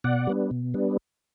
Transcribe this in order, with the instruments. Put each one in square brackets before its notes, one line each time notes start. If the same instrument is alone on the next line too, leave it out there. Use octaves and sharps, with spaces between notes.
[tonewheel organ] B2 D5 F#5
G3 B3 D4
B2
G3 B3 D4